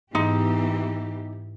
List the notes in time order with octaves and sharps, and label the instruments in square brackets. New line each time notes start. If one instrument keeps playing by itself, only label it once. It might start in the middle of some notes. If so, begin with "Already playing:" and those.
[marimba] G#2 [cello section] E3 B3 G4 [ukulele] D#4